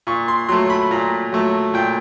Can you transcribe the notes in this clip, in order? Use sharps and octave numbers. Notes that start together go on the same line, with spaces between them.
A#2 C#6
C6
F#3 A3 C6
B5
A#2 A#5
F#3 A3
A#2 G5